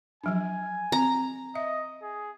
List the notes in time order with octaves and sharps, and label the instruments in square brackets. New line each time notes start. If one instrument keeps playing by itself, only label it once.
[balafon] F3 F#3 D4 [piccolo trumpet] G#5
[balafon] C4 [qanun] A#5
[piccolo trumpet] D#5 [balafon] E5
[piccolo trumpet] G#4